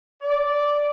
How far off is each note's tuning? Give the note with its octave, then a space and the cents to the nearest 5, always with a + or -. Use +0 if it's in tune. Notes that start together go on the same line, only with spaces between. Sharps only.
D5 -5